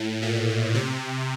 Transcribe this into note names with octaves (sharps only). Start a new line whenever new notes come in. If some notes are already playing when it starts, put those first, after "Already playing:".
Already playing: A2
A#2
C3